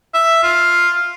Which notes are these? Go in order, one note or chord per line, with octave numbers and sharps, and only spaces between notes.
E5
F4